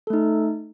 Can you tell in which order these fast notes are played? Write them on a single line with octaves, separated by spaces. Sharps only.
A4 A3 D#4